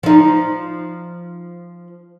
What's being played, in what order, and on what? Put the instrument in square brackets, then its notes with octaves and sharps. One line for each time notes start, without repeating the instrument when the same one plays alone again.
[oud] F3 D#4